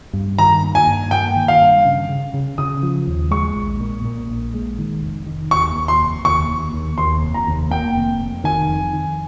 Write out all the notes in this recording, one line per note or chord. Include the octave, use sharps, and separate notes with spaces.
G2
D#3 A#5
A#3
G#5
G2
A#3 G5
D#3
F5
G2
C#3
C#3
C#3
C#3 D#6
F3
D#2
G#3 C#6
A#1
A#2
A#2
A#1
G#3
D#3
F1
D#3
D#2 C#6
D#2
C6
F1
D#2 C#6
D#2
D#2
D#2 C6
F1
A#5
D#2
A#3 G5
F1
F1
D#3 G#5
F2
D#3